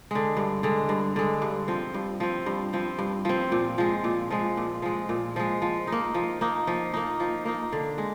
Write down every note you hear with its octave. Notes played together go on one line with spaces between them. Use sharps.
D3 G#3
G2
D3 G#3
G2
D3 G#3
G2
F3 C4
G2
F3 C4
G2
F3 C4
G2
F3 C4
A#2
F3 G#3
A#2
F3 G#3
A#2
F3 G#3
A#2
F3 G#3
F3
A#3 D#4
F3
A#3 D#4
F3
A#3 D#4
F3
A#3 D#4
D3
G#3